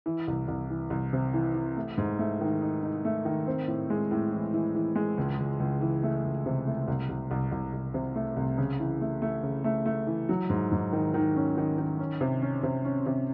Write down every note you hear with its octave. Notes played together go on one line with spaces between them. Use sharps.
E3
C2
C2
E3
C2
C3
E3
E3
A3
G#2
A3
D#3
D#4
D#4
A3
D#3
C4
A2
G#3
A2
E3
E3
E3
G#3
C#2
C#2
C#2
E3
A3
C#2
C3
A3
C2
C2
C2
C2
C2
C3
A3
C2
C#3
E3
A3
A3
C#3
A3
A3
E3
F#3
G#2
G#2
D#3
D#3
C#4
D#3
D#3
C#4
C3
C#4
C3
C#4
C3